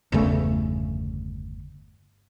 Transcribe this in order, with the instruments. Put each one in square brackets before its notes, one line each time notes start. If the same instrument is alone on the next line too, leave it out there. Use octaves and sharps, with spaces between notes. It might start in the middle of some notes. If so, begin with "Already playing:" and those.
[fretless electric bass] G1 E2 C#3 A3